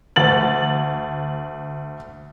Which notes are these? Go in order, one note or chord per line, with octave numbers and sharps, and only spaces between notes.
D2 A6 F#7